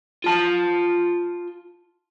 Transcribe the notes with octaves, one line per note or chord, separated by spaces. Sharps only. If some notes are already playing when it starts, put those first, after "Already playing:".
F4 A5